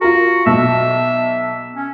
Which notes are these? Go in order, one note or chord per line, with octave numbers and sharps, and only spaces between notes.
F4 F#4 A#4
B1 E5
C#4